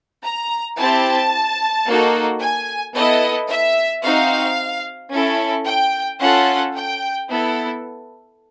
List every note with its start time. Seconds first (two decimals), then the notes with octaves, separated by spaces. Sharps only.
0.24 A#5
0.78 C4 E4 G4 A5
1.87 A#3 D#4 F#4 A4
2.41 G#5
2.95 B3 E4 A4 D#5
3.50 E5
4.04 C4 D#4 F#4 F5
5.12 C#4 E4 A4
5.67 G5
6.21 C#4 F4 A4 F#5
6.75 G5
7.29 B3 E4 A4